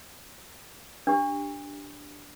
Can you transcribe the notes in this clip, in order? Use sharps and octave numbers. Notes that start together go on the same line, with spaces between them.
D4 G4